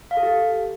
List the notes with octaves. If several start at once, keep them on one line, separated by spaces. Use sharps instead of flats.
F5
A4
G4